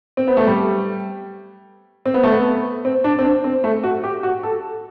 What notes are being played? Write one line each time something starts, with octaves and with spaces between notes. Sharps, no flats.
C4
B3
A3
G3
C4
B3
A3
B3
C4
D4
C4
D4
C4
A3
F#4
G4
F#4
A4